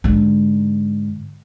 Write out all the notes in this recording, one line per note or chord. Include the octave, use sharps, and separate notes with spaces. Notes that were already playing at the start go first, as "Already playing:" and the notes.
G#2 D3